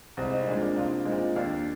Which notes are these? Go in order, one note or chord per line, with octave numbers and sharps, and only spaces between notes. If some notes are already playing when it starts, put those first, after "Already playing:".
C2 G#3 C4
C4 D#4
A#2 G#3 A#3 D4
A#3 D4
C2 D4 F4
A#2 G#3 C4 D#4
D#2 A#3 D4